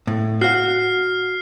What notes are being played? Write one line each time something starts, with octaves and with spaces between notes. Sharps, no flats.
A2
F#4 F#5 F6 C7